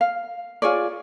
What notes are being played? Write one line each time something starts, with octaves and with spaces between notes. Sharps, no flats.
F5
F4 G#4 C#5 D5